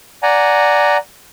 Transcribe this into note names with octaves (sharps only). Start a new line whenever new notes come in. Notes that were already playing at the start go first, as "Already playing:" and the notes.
D5 F#5 G#5 A#5